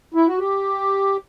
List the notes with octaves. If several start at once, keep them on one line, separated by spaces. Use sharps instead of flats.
E4
F#4
G4